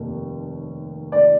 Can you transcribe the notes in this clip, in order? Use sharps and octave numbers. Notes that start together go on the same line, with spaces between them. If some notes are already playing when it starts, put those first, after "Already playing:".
Already playing: F1 D#2
D5